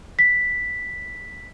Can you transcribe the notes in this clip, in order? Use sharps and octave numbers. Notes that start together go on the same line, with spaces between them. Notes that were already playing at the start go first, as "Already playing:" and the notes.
B6